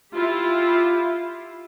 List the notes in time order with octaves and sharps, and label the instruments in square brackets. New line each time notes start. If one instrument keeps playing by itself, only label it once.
[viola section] E4 F4 G4